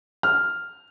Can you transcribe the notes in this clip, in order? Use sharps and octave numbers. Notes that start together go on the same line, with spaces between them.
F6